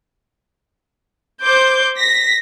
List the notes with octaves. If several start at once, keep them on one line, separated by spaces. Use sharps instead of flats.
C5 D6 G6
A#6 B6